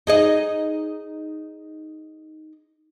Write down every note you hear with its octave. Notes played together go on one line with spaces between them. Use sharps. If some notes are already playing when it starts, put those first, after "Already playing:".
D#4 G#4 D#5